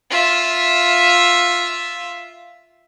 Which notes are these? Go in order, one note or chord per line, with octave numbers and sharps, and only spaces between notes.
F4 E5